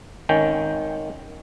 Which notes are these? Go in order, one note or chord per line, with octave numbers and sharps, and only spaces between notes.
G#1 D#3 C#4 G5